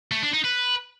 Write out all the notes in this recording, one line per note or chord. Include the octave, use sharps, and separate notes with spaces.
A3
D4
D#4
B4